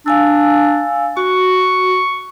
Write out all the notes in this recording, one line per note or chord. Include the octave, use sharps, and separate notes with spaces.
D4 F5 G#5 E6
F#4 C#6